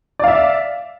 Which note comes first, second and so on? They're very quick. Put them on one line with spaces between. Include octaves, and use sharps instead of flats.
D5 F5 E5